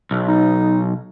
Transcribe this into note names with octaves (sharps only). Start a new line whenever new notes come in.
B1
D#4